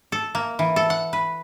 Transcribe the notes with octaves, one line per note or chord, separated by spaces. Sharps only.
A4
A#3
E3
A4
F#5
B4